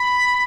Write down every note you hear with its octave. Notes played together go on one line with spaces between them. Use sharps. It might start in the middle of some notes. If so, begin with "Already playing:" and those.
Already playing: B5